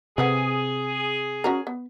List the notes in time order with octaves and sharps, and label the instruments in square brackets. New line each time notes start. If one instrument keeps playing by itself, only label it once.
[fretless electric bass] C3 [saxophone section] G#4 [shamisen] A4 B4 F#5
[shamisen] C#4 F#4 A#4
B3